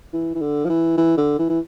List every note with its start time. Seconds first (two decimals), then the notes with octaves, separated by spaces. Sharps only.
0.14 E3
0.35 E3
0.42 D3
0.65 F3
0.69 E3
0.97 E3
1.18 D3
1.39 E3
1.49 E3